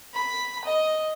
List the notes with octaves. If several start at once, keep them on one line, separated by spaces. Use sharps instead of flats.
B5
D#5